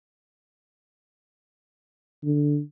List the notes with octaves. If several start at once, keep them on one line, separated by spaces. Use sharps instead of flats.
D3